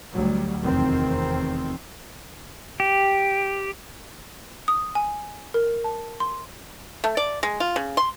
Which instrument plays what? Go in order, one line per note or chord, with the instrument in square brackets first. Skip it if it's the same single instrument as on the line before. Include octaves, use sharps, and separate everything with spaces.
[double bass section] D2 F#3 G3
F1 E2 D#3 C4
[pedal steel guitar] G4
[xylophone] D#6
G#5
A#4
A5
C6
[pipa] A3
D5
G#3
F4
C#3
C6